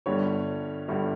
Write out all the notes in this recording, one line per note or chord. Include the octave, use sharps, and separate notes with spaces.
G1 G2 D3 G3 C#5
G1 G2 D3 G3